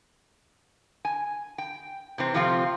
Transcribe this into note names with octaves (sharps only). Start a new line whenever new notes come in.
G#5
G5
C3 E3 C4
C3 F3 A3 C4 F4